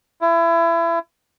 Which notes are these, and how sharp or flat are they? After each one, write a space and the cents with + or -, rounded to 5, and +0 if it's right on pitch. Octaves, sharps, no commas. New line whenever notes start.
E4 +30